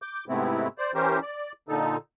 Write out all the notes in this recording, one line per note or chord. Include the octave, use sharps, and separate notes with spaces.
D6 G6
G#2 C3 A3 B3 C4 E4
C5 D5
E3 C#4 G4 A#4 C5
D5
A#2 D3 D#4 A4